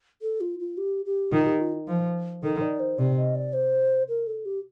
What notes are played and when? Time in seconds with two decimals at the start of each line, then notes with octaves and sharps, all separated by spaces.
0.22 A4
0.41 F4
0.59 F4
0.78 G4
1.05 G4
1.32 D#3 F4
1.46 G4
1.61 F4
1.88 F3
2.43 D#3 A4
2.61 D5
2.80 C5
2.98 C3 D5
3.16 D#5
3.35 D5
3.53 C5
4.08 A#4
4.27 A4
4.45 G4